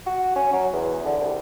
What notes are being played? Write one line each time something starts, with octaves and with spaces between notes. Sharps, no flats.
F#4
C#4
F#3
E2
D3
C2